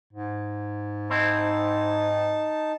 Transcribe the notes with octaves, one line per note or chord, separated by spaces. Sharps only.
G#2
C4 D#4 E4 A5